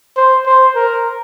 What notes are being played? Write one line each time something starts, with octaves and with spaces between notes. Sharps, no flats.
C5
C5
A#4